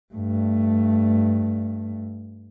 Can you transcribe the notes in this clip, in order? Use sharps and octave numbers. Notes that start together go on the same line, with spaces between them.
G2 A3